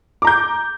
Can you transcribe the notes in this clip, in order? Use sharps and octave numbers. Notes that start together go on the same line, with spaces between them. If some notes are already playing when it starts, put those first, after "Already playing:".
A#5 D6 G6